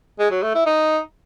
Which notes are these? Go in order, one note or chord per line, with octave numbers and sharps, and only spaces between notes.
G#3
F#3
A3
E4
D#4